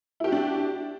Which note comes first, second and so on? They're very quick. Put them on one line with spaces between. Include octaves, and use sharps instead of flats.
E4 G4 F#4 D4